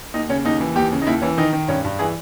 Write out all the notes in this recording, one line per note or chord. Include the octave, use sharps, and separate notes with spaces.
D#2 D#4
C#3 C#4
D#2 D#4
E3
D#2 G4
C#3
D#4
D#2 E4
E3 C#4
D#3 D#4
D#3
G2 C#4
G2
E3 G#4